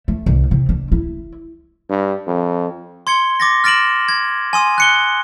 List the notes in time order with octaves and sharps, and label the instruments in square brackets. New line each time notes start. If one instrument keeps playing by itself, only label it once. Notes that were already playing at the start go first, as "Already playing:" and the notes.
[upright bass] A3
C2
C3
D4
E4
[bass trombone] G2
F2
[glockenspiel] C6 G#6 C#7 G7
D6 A6 A#6
F6 A6 A#6 D7 E7 F#7
G#6
G#5 C6 D#6
F#6 C#7 G7